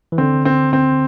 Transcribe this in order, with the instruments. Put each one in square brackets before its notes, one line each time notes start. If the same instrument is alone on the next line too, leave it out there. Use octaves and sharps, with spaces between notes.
[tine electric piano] E3
[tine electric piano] D3 [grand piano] C4
[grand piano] C4
C4